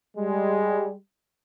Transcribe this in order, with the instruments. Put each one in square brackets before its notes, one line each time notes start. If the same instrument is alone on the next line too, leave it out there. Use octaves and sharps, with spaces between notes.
[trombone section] G3 G#3